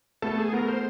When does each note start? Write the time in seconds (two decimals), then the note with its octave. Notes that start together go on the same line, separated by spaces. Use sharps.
0.22 A3 B3 A4
0.38 G#4
0.52 A3 B3 A#4
0.68 C5